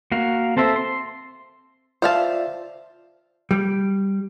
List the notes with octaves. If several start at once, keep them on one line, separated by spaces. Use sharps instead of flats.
A#3 F#4 F5
C4 A4 C5 E5
C6
F4 C5 D5 E5 F5 A5
G3